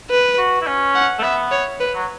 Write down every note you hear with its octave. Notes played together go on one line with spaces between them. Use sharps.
B4
F#4
E4
C#4
F#5
A3
B3 E5
C#5
B4
F#3